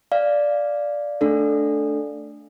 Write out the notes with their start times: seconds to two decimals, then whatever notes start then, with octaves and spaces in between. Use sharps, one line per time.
0.12 D5 F5
1.21 A3 D4 A4